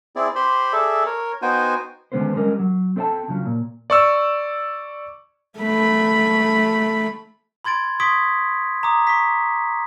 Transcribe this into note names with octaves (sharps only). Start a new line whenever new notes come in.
C4 E4 G#4 D5
G4 C5 B5 C6
G#4 A4 D5 E5
A#4 C#5
B3 D#4 F#4 C5 G5 G#5
D3 D#3 G#3 B3 C#4 C5
G3 G#3 B3 C#4 A#4 D#5
F#3
C4 A4 B4 D5 G5 A5
C#3 F3 F#3 C#4
A#2
D5 C#6 E6
A3 B5
B5 C6 G#6 A6 D7
C6 C#6 D#6 G#6 B6 D7
A#5 D6 D#6
C#6 B6